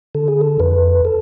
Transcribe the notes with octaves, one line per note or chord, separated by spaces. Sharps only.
D3 A4
G#4
A4
F2 B4
A4